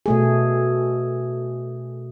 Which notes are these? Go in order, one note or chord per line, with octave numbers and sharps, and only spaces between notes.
B2 A3 G#4